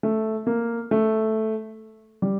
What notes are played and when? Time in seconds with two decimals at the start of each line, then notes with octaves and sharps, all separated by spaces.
0.03 A3
0.47 A#3
0.91 A3
2.22 G3